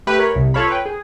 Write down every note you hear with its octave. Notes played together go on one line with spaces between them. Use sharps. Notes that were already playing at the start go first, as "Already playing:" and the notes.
A3 G4 B4
A#4 C#5 B5
C2
F4 A4 C#5 F5 B5
B4 G5
G#4